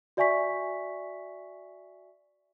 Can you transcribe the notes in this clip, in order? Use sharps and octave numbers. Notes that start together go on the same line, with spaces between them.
F#4 D5 E5 G#5 C#6 B6